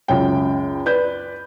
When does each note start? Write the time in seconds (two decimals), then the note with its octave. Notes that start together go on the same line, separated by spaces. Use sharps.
0.08 C#2 F#2 G5
0.86 B4 D5 G6